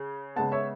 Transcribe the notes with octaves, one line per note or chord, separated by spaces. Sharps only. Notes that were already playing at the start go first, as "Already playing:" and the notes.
Already playing: C#3
C#3 G#3 B3 F#5 A5
C#5 E5